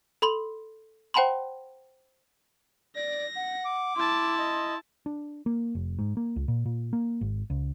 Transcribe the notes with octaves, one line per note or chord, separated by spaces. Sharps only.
A4 B5 C6 F#7
C5 F#5 G5 A5 B5 C6
D5 A#6
F#5
D6
E4 A5 C6
D#5
D4
A#3
F1
G#2
A#3
C#2
A#2
A#2
A#3
G#1
C#2